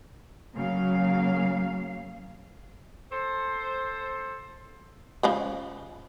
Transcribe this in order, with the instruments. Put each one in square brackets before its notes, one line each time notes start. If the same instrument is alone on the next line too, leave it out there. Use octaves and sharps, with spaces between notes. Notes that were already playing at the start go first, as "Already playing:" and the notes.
[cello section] C#3 F#3 A#3 F5
[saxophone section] A4 C5
[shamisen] C#3 F3 G#3